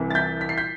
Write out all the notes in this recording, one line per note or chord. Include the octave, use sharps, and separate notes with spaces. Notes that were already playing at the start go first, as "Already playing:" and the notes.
Already playing: C2 C3 E3
A6
G6 B6
B6
C7
G6 B6